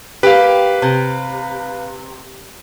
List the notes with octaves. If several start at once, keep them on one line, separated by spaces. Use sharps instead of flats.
A#3 G4 B4 F5
C3